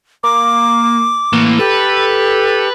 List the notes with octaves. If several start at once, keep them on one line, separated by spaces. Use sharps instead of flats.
A#3 D6
A2 E3 A#3
G4 A4 B4